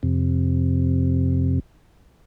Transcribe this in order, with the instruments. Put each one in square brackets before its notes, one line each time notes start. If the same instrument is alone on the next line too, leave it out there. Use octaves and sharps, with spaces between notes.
[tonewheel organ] F2 C3